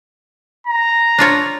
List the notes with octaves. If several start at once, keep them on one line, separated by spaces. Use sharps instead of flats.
A#5
D4 F4 C#5